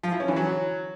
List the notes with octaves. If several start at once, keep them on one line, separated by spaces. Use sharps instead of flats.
F3
E4
C#4
E3
F#3